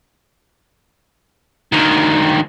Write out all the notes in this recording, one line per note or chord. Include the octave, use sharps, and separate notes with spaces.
D2 D#3